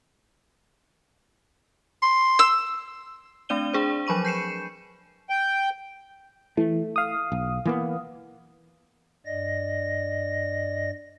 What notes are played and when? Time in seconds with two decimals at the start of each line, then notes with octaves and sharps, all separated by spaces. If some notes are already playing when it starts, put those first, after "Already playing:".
2.03 C6
2.39 E6
3.49 A3 C4 D4 D5 D#7 G7
3.73 D4 G#4 C5
4.07 F3 F#3 B5 C#6 D#7
4.25 G6 C7 C#7 E7
5.29 G5
6.57 E3 A3
6.96 F5 D#6
7.32 B1
7.65 E3 A#3 B3
9.26 G2 D5 D#5 A#6